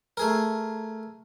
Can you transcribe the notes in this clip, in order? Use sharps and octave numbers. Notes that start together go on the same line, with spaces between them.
A3 G#4 A#4